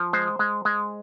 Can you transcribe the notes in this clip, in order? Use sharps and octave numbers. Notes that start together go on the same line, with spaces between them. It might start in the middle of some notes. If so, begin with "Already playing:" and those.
Already playing: F3
G#3 C5
G#3
G#3